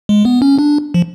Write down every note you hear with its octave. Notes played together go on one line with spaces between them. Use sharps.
G#3
B3
C#4
D4
F3